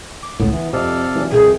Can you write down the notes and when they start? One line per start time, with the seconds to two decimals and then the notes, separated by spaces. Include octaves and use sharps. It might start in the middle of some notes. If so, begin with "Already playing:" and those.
0.23 D6
0.40 C#2 A2 B3
0.53 E3
0.73 F2 C3 A4 D5 F5 D#6
1.15 E3 F#3 D4
1.32 C2 F2 G#4 G5